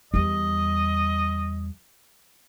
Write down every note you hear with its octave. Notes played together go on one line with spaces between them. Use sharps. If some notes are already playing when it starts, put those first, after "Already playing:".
E2 G3 D#5